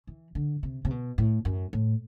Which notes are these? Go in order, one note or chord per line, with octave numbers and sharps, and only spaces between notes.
E3
D3
C3
C3
B2
A2
F#2
A2